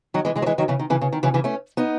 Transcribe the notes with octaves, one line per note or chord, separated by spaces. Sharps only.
D#3 F#3
E3 G#3
E3 G#3
F#3
E3 G#3
D#3 F#3
C#3 E3
D#3
C#3 E3
C#3
D#3
C#3 E3
C#3 E3
A3 C#4
B3 D#4